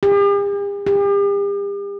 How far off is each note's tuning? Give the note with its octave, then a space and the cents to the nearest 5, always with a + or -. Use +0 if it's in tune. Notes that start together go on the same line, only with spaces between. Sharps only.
G4 +45
G4 +40